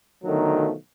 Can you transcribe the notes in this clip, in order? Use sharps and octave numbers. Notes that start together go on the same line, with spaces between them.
B1 D3 D#3 F3 F#3 A3